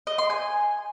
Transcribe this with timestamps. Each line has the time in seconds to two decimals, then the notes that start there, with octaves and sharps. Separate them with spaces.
0.07 D#5
0.18 C6
0.30 G#5